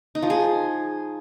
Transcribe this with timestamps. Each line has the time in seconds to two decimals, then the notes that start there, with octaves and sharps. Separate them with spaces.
0.15 D#4
0.22 F3
0.30 G#4